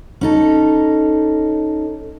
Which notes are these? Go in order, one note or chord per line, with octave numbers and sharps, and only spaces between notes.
C#4 D#4 A4